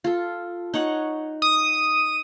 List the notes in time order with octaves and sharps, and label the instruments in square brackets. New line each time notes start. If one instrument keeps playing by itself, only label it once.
[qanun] F4 A4
D#4 C#5 F#5
[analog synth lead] D#6